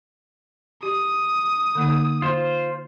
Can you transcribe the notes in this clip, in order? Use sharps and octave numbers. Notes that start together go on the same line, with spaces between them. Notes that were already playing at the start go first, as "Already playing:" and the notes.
G4 D#6
D3 A#3 D#4
F4 C5